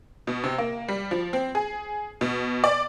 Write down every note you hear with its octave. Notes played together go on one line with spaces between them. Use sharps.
B2
C3
A#3
G3
F3
C4
G#4
B2
D5